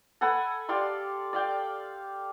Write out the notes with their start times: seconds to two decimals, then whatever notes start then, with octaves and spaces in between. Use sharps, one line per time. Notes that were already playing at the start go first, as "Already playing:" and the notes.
0.21 A4 F#5 G#5 B5
0.69 G4 D5 F5 C6
1.33 D5 F5 G5